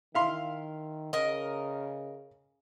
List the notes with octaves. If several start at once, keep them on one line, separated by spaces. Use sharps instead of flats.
D#3 E4 F5 C6
C#3 A#4 D#5